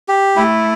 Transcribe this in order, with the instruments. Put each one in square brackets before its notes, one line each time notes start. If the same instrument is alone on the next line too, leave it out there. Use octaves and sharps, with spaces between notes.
[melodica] G4
[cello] A3 [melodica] E4